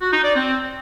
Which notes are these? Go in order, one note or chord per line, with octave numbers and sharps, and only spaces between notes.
F#4
D#4
D5
C4